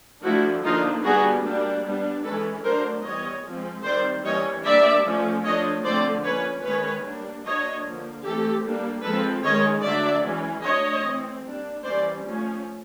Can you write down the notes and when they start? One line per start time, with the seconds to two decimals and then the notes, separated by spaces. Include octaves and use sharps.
0.25 F3 A3 D4 E4 F#4
0.65 D3 F3 A#3 D4 D#4 F4
1.05 G3 B3 D4 F#4 G#4
1.45 G3 A#3 D4
1.85 G3 B3 D4
2.25 E3 G#3 C#4 A4 B4
2.64 F#3 A3 D4 A#4 C5
3.05 E3 G3 B3 C#5 D#5
3.45 F3 G#3 C4
3.84 D#3 G3 C4 C5 D5
4.24 E3 G3 A#3 C#4 C#5 D#5
4.64 G3 A#3 D4 D5 E5
5.05 F3 A3 C#4
5.44 F3 A3 D4 C#5 D#5
5.85 D3 F3 A3 C4 C5 D5
6.25 F3 A#3 C#4 B4 C#5
6.64 D#3 G#3 C#4 B4 C#5
7.04 G3 A#3 D4
7.44 F#3 A#3 D4 C#5 D#5
7.85 D3 F3 A#3
8.24 E3 A3 C4 G4 A4
8.64 G3 A#3 D4
9.04 F3 G#3 C4 A4 B4
9.44 D#3 G#3 C#4 C#5 D#5
9.84 D3 F#3 A3 D4 D5 E5
10.25 E3 G#3 C#4
10.64 F#3 A3 D4 C#5 D#5
11.04 E3 A3 C4
11.45 G3 A#3 D4
11.84 E3 G3 A#3 C#4 C5 D5
12.24 F3 A3 C#4